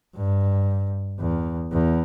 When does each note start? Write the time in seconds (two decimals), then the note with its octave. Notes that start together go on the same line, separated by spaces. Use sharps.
0.16 G2
1.20 E2
1.72 E2